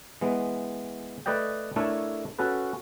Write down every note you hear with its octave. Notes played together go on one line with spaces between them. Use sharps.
E3 G#3 B3
A3 B4 D5 D#5 G5
A3 D4 E4 A4 A#4 C#5
C#4 F#4 A4 B4